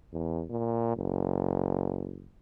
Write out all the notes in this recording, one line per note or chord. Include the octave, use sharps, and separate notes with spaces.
E2
A#2
F#1